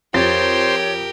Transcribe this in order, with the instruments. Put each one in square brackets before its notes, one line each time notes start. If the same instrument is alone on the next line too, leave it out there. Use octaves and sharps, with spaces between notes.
[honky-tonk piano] F2 A6 [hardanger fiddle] G4 A#4 [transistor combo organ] C5 [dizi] C#5